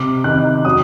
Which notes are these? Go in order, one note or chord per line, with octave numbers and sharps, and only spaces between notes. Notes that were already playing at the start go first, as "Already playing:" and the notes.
Already playing: C3 D6
D#3 F#6
F#3 D#6